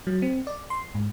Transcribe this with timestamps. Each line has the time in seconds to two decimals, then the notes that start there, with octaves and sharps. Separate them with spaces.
0.07 F#3
0.22 C4
0.47 D5
0.70 C6
0.95 G#2